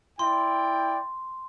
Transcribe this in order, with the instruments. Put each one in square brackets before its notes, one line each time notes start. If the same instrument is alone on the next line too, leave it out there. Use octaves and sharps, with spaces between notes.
[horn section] E4 D5 G5 [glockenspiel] C6